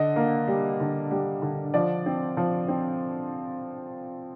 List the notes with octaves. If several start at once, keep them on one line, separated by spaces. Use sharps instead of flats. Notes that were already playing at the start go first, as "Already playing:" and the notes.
Already playing: D3 D#5
A#3
G3
D3
G3
D3
F3 D5
C4
F3
C4